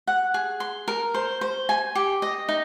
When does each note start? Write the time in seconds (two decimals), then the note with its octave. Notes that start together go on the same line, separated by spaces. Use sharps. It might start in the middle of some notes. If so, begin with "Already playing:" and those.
0.07 F#5
0.34 G#4
0.60 C6
0.88 A#4
1.14 C5
1.41 C5
1.69 G#5
1.95 G4
2.22 D#5
2.49 D#4